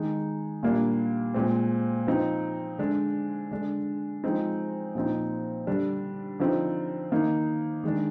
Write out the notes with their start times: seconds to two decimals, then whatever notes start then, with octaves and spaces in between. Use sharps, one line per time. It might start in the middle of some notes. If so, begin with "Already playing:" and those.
Already playing: D#3 G#3 D#4
0.63 A#2 G3 A#3 D4
1.34 A#2 G#3 C4
2.07 F3 C4 D#4
2.78 D3 G#3 D4
3.51 D3 G#3 D4
4.24 F3 G#3 C4 D#4
4.95 A#2 F3 C4 D#4
5.67 D3 G3 D4
6.39 D3 F3 C4 D#4
7.12 D#3 A#3 D#4
7.84 D#3 G#3 D4